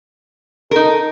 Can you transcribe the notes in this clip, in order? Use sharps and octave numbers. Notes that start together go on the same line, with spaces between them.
D#4 A4 A#4